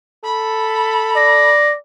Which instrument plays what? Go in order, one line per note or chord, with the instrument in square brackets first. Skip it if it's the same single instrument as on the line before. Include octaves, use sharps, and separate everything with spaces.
[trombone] A4 [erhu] B5
[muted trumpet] D5 [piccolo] A#6